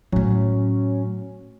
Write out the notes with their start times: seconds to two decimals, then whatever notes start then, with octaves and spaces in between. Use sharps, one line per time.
0.12 A2 F#3 A3 C#4